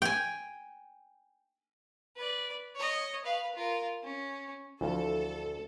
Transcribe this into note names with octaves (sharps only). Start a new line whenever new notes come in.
G5 G#5
B4 D5
C#5 D#5
B4 F5
F4 A#4
C#4
D2 E3 F3 A4